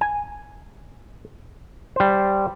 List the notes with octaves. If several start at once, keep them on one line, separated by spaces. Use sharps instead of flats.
G#5
G3 C5